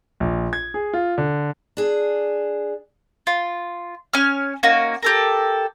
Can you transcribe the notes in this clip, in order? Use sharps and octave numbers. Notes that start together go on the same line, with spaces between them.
A#1
G#6
G#4
F4
D3
D4 G#4
F4
C#4 G#5 F6
A#3 C#4 D#4 F#4
G4 A4 A#4